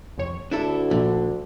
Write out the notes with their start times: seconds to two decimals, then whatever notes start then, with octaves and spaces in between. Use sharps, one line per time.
0.18 C2 F2 C#5
0.51 D2 D4 E4 A4
0.91 A#1 D3